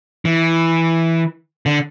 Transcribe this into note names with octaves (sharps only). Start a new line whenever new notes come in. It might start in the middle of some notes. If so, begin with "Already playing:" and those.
E3
D3